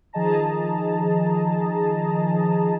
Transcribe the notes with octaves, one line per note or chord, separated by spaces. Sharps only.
D#3 F3 G#4 D#5 A5 A#5